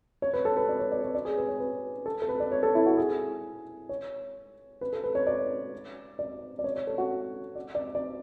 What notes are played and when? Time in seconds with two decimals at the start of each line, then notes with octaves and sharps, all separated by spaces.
0.22 C#5
0.33 B4
0.45 A4
0.57 B4
0.69 D5
0.79 C#5
0.92 D5
1.03 C#5
1.15 D5
1.25 G#4
1.38 B4
1.48 C#5
1.60 B4
2.06 A4
2.22 A4
2.29 B4
2.40 D5
2.52 C#5
2.63 A4
2.75 E4
2.86 F#4
2.97 G#4
3.89 C#5
4.81 B4
4.93 A4
5.04 B4
5.15 C#5
5.27 D5
6.19 D5
6.59 D5
6.64 C#5
6.76 C#5
6.87 A4
6.98 F#4
7.55 D5
7.75 D5
7.95 D5